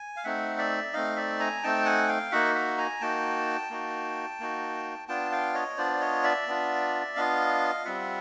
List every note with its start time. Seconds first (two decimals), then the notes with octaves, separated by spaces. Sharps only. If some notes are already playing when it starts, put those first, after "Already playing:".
Already playing: G#5
0.16 F5
0.24 A3 C4 D#4 E5 F#5
0.58 D5 E5
0.93 A3 C4 D#4 D#5 F5
1.16 D5 E5
1.40 G#5 A#5
1.63 A3 C4 D#4 G5 A5
1.85 F#5 G#5
2.08 F5 G5
2.32 A#3 D#4 F#4 E5 F#5
2.55 E5 F#5
2.78 G#5 A#5
3.00 A#3 D#4 F#4 G5 A5
3.70 A#3 D#4 F#4
4.40 A#3 D#4 F#4
5.08 B3 D4 F4 G5 A5
5.31 F5 G5
5.54 C#5 D#5
5.77 B3 D4 F4 C5 D5
6.00 C#5 D#5
6.23 D5 E5
6.48 B3 D4 F4
7.16 B3 D4 F4 D#5 F5
7.85 G3 C4 F4 E5 F#5